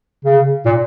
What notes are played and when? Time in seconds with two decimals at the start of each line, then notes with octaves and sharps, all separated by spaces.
0.24 C#3
0.65 A#2